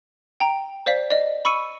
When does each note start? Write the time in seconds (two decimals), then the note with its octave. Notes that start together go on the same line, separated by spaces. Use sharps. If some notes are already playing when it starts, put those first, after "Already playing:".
0.40 G5 A#5
0.86 C5 D5 F5 B6
1.11 D5 D#5
1.45 B5 C#6 E6 C#7 D#7